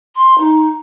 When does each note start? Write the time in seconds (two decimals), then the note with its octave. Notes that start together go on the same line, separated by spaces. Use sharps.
0.15 C6
0.38 D#4